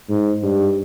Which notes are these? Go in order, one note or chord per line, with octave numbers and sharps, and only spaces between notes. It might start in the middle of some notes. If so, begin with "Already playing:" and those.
G#2
G2